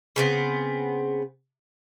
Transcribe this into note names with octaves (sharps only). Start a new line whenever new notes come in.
C#3 B3 C4